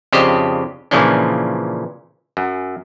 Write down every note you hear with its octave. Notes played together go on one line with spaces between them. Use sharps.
F2 C#3 D4 G4 C5 D#5
A#2 C#3 E3 F3 C#4 D4
F#2